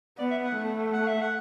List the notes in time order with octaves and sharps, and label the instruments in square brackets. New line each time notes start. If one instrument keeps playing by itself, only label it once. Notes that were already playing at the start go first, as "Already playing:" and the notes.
[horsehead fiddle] B3 [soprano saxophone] D5
[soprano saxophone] E5
F#5
[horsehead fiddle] A3
[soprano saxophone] F#5
E5
F#5